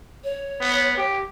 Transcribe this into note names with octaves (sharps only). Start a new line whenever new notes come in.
C#5
B3
G4